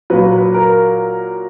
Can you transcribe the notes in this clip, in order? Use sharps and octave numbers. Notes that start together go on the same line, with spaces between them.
A#2 F#3 B4
B4
A#4